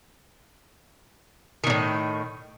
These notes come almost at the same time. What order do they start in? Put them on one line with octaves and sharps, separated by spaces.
D#3 C3 A2